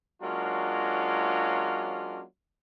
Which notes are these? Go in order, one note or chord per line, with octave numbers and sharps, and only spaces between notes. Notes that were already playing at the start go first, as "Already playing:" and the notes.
F#3 G#3 A#3 C#4 D4 F4